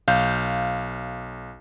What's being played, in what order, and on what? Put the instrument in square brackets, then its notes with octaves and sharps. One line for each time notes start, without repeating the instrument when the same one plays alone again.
[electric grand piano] B1 F5 G6